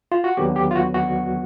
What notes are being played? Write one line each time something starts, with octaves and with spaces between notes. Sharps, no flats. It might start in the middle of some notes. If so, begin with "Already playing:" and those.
F4
F#4
D#2 D3 F#3 B3 G4
G4
F4
F#4
F#4